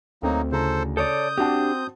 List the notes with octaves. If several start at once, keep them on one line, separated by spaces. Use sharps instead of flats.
D2 F#3 A#3 C4 D#4 A4
C#3 E4 A4 C5 A#5
A4 C#5 D5 D#6 G6
C4 D4 F#4 G4 F#5 A5